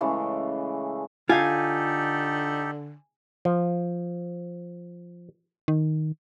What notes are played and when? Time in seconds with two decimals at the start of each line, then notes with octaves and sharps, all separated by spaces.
0.01 C#3 E3 G#3 A3
1.29 D3 D#4 F4 G4 A4 F5 G#5
3.45 F3
5.68 D#3